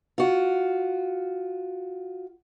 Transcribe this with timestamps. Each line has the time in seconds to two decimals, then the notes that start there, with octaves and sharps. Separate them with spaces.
0.18 F4 F#4